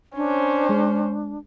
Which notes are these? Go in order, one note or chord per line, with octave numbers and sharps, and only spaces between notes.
C#4 D4 C5
G#3